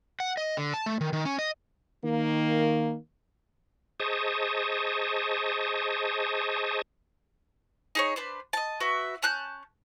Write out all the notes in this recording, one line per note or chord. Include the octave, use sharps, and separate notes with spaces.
F#5
D#5
D3
A5
A3
D#3
D#3
C#4
D#5
D#3 A#3
G#4 C5 D#5 A5 C#6 D#6
D#4 G#4 C#5
D4 B4 C5
D#5 A5
F#4 B4 E5
C#4 A5 F#6 G6